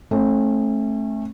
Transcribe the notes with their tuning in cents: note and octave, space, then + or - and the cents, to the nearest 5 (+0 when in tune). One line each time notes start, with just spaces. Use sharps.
A3 -10 C#4 -45